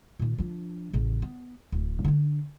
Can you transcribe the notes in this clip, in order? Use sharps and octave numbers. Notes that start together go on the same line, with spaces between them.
A#2 D#3
F3 D4
A1 C#3
B3
D1
D3 D4